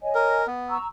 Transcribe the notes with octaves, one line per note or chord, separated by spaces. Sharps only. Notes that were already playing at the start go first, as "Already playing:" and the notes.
C#5 D#5 G#5
A#4
B3
A#5 C#6 E6